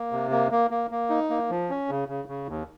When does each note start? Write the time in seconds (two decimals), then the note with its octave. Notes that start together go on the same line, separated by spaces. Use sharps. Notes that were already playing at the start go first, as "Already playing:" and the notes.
Already playing: A#3
0.12 C3
0.31 A#3
0.51 A#3
0.71 A#3
0.91 A#3
1.10 D#4
1.30 A#3
1.50 F3
1.70 C#4
1.89 C#3
2.08 C#3
2.28 C#3
2.48 D#2